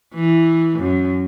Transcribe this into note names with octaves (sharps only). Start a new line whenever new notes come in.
E3
F#2